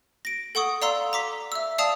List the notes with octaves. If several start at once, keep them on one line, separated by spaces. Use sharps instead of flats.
A#6 D7
A4 F#5 C#6 D#6
D5 F5 A#5 C6 E6
A#5 D6 B6
E5 E6
D5 F5 A5 D#6 F7